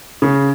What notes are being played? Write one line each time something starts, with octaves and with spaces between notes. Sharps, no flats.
C#3